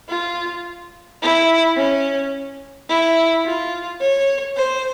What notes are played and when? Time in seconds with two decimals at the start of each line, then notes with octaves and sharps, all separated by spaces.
0.09 F4
1.22 E4
1.77 C#4
2.89 E4
3.45 F4
4.01 C#5
4.57 C5